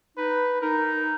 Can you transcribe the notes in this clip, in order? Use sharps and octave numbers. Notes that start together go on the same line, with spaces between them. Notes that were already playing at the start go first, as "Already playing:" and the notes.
D#4 B4
D#4 A#4